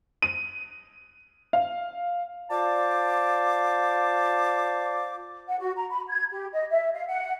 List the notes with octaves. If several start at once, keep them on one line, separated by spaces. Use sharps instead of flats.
D#7
F5
F4 C5 D5 A5 D6
F#5
F#4
A#5
B5
G#6
G4
D#5
E5
F5
F#5